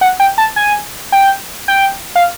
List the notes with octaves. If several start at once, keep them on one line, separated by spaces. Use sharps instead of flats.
F#5
G5
A5
G#5
G5
G5
F5